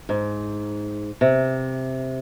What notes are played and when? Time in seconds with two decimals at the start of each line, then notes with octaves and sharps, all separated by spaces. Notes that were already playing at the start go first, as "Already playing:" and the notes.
0.09 G#2
1.21 C3